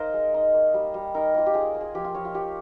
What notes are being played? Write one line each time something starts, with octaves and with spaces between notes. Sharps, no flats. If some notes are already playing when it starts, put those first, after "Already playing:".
Already playing: D#4 A#4 C5 D#5 F5
G#3
D#4
A#3
G3
G3
D#4 A#4
A#3 F4
G4
F4 G#4
A#3
G#4
F3 G4
F4
F3 C#5
F4
F3 G4